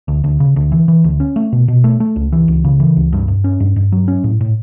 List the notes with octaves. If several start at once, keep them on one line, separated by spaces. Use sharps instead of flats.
D2
D2
C#3
D2
E3
E3
D2
C#4
A3
B2
B2
A3
A3
C#2
E3
C#2
C#3
E3
C#2
G2
G2
C#4
G2
G2
F#3
C#4
A2
A2